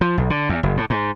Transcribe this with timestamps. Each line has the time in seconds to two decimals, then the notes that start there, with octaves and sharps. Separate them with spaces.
0.01 F3
0.18 B1
0.30 D3
0.49 E2
0.63 F#1
0.77 A2
0.90 G#2